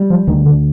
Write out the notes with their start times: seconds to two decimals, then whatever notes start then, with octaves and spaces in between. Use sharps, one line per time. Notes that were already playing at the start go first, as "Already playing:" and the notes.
Already playing: G3
0.10 F3
0.28 D2 D#3
0.46 D3